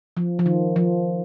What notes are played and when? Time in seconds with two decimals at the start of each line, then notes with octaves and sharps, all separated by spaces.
0.17 F3
0.39 F3
0.46 D#3
0.76 F3